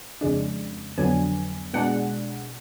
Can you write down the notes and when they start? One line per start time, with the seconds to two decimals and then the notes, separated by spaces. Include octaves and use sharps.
0.21 F2 C#3 G#3 D4
0.98 F2 D3 F#3 B3 D4 G#5
1.73 B2 G#3 D4 F#5